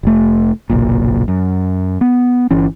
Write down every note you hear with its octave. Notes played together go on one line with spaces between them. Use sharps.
F1 A3
F#1 B1 A#2
F#2
B3
G1 E3 C#4